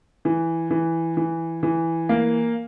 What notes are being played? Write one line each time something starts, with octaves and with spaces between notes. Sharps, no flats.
E3
E3
E3
E3
A#3